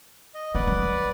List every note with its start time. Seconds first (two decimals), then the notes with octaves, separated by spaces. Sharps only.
0.34 D#5
0.55 A#3 B4 D5 F#5
0.67 F#3